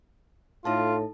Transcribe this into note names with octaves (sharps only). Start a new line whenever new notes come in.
A2 D#4 F4 A4 A5